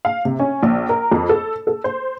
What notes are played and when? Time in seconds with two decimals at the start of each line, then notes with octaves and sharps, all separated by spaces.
0.05 F5
0.25 C3
0.39 C#4
0.63 A#1
0.89 A#4
1.12 F2
1.29 A4
1.67 A4
1.84 C5